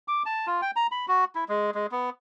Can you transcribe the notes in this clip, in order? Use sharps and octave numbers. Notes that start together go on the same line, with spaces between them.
D6
A5
F4
G5
A#5
B5
F#4
E4
G#3
G#3
B3